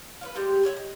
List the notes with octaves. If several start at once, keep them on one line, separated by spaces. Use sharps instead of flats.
B4 C#5 F5
G3 G#3 G4
B4 C#5 D#5 E5
D#5